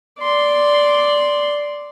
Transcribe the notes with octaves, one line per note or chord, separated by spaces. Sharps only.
D5 C6